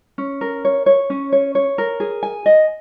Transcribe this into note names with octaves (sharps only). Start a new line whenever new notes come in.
C#4
A#4
C#5
C#5
C#4
C#5
C#5
A#4
G#4
G#5
D#5